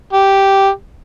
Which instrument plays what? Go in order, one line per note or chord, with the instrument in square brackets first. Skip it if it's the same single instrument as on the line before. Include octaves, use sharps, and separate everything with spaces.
[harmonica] G4